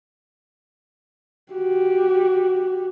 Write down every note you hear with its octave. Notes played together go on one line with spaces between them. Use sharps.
F#4 G4